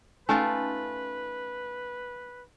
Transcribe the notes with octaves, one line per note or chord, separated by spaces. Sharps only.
A3 C#4 D#4 F4 B4 G#5